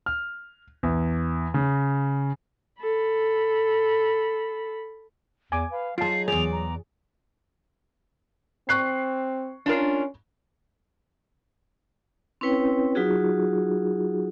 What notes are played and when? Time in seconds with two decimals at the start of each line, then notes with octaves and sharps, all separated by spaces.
0.06 F6
0.83 E2
1.54 C#3
2.81 A4 B5
5.52 E2 G#5 D6
5.71 B4 F5
5.98 F#3 D#4 F4 G#4 A5 C7
6.28 E2 G#4 D5 F7
6.52 A#5
8.69 C4 C#6 F#6 C7
9.66 C#4 D4 F4 A#4
12.41 C4 C#4 E4 B4 C#5 G5
12.95 F#3 D#4 F4 F#4 G#4